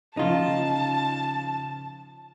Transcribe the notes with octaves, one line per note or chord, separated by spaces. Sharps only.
C#3 F3 D#4 F4 A5